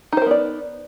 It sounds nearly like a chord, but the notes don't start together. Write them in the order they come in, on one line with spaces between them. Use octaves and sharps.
D#4 C5 A#4 B3 D5